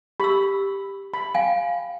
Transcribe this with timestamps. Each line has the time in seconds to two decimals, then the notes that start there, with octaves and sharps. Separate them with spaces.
0.20 G4 B5 E6
1.14 B5
1.34 F5 G5 G#5